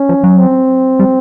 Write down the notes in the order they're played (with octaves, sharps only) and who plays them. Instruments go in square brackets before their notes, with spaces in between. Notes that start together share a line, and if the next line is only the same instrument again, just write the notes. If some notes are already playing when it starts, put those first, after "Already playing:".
Already playing: [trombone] C#4
[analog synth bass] F3
F#3
[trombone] C4
[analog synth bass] G3